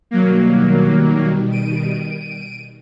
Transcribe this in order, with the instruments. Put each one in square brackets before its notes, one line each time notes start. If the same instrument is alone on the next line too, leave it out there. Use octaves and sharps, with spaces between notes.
[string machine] B2 D#3 G3 [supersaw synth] F#3 A#3
[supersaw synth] D7 D#7